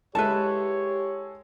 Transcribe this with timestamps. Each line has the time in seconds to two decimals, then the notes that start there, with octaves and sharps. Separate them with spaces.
0.15 G#3 E4 G4 A4 B4 C#5 A5